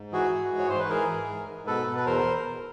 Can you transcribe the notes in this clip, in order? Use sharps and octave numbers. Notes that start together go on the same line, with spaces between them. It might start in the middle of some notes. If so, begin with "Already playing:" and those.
Already playing: G#2
E3 F#4 G#4
E3
G#2
C#5
G#2 C5
B4
E3 G#4 A#4
E3
G#2
G#2
B2 A4 B4
B2
B4
E2 A#4 C5